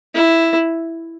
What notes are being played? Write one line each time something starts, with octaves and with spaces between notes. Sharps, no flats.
E4